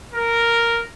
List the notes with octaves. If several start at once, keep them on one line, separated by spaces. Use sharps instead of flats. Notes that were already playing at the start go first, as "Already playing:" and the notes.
A#4